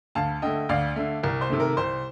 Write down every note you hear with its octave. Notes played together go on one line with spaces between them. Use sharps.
D2 F5 A5
D3 A3 D#5 G5
D2 D5 F5
D3 A3
C2 A#4
C5
C3 D#3 A3
A#4
C2 C5